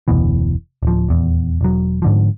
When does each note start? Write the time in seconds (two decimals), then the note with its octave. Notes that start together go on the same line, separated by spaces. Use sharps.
0.08 F1 D2 B2 E3
0.83 D1 F3
1.09 D#1 E2
1.61 E1 F#3
2.02 G#2 D3 F3